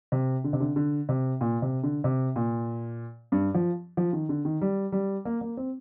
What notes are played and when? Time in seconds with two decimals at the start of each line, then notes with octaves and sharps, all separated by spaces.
0.12 C3
0.44 D3
0.53 C3
0.60 D3
0.76 D3
1.09 C3
1.41 A#2
1.62 C3
1.83 D3
2.04 C3
2.36 A#2
3.32 G2
3.55 F3
3.97 F3
4.13 D#3
4.29 D3
4.45 D#3
4.61 G3
4.92 G3
5.25 A#3
5.41 A#3
5.57 C4